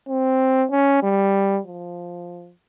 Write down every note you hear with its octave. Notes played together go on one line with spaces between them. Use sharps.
C4
C#4
G3
F3